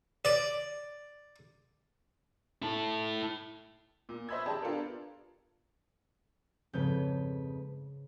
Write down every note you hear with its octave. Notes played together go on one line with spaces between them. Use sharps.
D5
E4 A4
A#2
C5 D#5 E5 B5 E6 G#6
G4 G#4 D5 A5
B3 D4 F4 G4 A4 A#4
F2 G#2 C#3 B4 G6